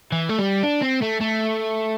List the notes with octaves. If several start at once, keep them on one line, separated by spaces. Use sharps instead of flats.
E3
A3
G3
D4
C4
A3
A3